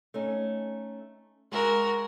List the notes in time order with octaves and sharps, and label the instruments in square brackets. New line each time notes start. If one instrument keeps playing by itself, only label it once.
[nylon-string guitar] A3 C#4 D#4
[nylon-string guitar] G#3 E5 [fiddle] F#4 A#4